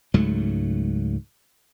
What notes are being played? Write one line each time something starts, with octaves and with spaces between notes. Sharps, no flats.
C#2 G#2 F#3 A3